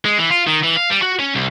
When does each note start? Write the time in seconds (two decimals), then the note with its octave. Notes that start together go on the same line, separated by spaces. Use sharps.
0.05 G#3
0.18 E3
0.31 F4
0.47 D#3
0.64 E3
0.77 F5
0.91 G3
1.03 F#4
1.19 C#4
1.35 C2